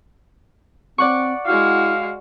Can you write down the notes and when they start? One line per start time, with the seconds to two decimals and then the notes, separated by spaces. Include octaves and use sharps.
0.98 C4 D5 F#5 C#6
1.46 G#3 E4 F#4 F5